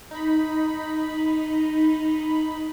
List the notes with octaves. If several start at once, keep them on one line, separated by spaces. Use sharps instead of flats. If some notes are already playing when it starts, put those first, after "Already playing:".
D#4 B5